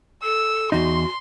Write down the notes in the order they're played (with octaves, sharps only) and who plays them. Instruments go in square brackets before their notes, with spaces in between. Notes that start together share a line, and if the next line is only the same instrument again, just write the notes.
[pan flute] A4 [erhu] E6
[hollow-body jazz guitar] E2 D#4 [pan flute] F#4 [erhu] C6